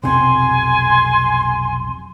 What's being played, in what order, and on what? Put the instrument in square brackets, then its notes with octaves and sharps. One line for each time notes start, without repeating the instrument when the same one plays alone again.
[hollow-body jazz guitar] B1 F2 C3 [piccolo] G#5 [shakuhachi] C6